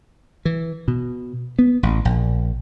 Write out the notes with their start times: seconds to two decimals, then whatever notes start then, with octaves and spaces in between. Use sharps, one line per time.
0.45 E3
0.88 B2
1.59 B3
1.83 A1
2.05 A#1